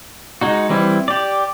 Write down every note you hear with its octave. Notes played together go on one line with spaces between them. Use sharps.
G#3 D#4 F#4
E3 G3 C4 E4
G4 D5